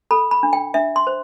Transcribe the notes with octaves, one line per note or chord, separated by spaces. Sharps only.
A4 B5
B5
D4
G5
D4 E5
C6
C5